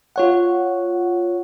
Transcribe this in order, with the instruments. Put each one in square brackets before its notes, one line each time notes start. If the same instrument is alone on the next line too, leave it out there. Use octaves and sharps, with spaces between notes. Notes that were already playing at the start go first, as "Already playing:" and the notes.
[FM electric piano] F4 C#5 F#5